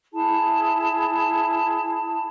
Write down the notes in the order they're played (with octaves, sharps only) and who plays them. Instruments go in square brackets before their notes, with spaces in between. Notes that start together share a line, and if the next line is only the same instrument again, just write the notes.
[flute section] E4 G#4 A5